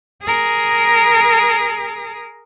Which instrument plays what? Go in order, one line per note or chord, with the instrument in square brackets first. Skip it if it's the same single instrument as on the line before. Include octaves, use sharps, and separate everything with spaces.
[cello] G#4 A#4